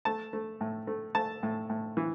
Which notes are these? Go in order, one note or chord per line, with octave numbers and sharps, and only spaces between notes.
A3 A5
A3
A2
A3
A3 A5
A2
A2
E3